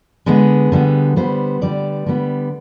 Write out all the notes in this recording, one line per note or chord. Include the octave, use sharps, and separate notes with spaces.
D3 G#3 B3 G#4
D3 G3 B3
D3 G3 B3 C5
D3 G3 B3 D5
D3 G3 B3